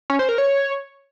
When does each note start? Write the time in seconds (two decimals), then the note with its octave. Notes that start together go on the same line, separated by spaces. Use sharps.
0.10 C#4
0.19 C5
0.29 A#4
0.38 C#5